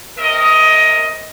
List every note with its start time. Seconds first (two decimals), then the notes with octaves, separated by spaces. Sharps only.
0.18 C3 A#4 D#5